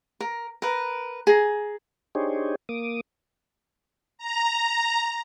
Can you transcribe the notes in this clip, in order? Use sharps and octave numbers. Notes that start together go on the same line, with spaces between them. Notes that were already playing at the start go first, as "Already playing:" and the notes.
A#4
A#4 B4
G#4 A#5
D4 D#4 G4 G#4 C5 C#5
A#3 D6 D#6
A#5